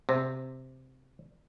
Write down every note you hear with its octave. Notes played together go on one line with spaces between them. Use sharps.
C3